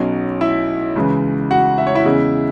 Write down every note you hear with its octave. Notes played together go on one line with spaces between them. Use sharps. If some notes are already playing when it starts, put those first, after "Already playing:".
Already playing: B1 B2 F#3 C#4
E4 E5
C#2 C#3 E3
F#4 F#5
E5
C#5
E4 E5
E2 C#3 G#3